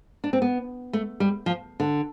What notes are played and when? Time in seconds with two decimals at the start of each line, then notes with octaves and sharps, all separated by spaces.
0.24 D4
0.33 C4
0.42 B3
0.93 A3
1.20 G3
1.46 F3
1.80 D3